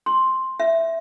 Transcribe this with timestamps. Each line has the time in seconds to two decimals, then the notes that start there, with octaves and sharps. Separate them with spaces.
0.06 C6
0.60 E5